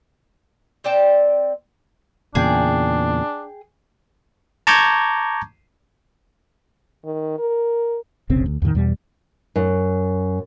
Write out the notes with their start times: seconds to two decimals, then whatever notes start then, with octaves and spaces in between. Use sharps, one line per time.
0.84 C4 D5 G5 A5
2.35 E2 A#2 C#3 D4 G#4 G5
4.67 A5 A#5 C#6 D6 G6 G#6
7.05 D#3
7.39 A#4
8.30 F1 B1 C#3 C4
8.46 D2
8.62 E2 A2 D3 D#3
8.75 E2 B2 G3
9.56 F#2